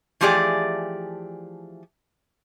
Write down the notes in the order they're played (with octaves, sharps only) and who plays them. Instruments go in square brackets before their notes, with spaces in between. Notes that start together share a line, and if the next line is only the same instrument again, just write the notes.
[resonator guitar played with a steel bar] E3 F3 A3 G4 G#4 D5